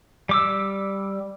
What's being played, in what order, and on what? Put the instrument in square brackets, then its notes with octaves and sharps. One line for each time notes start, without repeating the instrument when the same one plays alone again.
[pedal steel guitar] G3 D6 E6